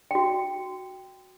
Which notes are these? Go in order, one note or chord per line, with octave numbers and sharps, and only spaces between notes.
F#4 G5